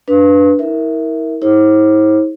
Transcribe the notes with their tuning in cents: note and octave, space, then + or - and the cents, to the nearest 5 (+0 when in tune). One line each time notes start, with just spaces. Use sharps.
D4 -5 B4 +0
E4 -40 A#4 +0 E5 +0
E4 -45 G#4 +0 C5 +40